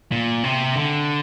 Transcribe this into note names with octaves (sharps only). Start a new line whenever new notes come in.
A#2
C3
D3